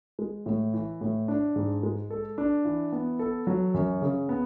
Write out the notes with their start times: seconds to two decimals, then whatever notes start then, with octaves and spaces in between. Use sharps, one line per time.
0.19 G#3
0.46 A2
0.74 E3
1.01 A2
1.28 D4
1.56 G#2
1.83 G#3
2.10 A4
2.38 D4
2.65 E3
2.92 B3
3.19 A4
3.47 F#3
3.74 F#2
4.02 C#3
4.29 B3